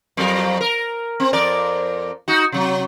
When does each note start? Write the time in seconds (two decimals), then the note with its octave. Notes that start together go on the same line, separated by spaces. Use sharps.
0.17 F2 F#3 A#4
0.61 A#4
1.20 C4
1.33 F2 A#4 D5
2.28 D#4 F#4
2.52 C3 F#3